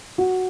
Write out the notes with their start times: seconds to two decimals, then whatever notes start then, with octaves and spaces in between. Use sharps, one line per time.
0.18 F#4